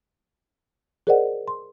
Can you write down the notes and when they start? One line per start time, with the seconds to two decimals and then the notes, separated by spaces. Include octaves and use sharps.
1.07 G#4 A#4 C5 D5 D#5 F#5
1.48 C6